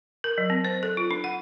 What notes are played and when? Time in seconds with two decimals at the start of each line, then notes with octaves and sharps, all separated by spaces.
0.24 A#4
0.38 F#3
0.50 C4
0.65 C5
0.83 A4
0.97 F4
1.11 D4
1.24 F#5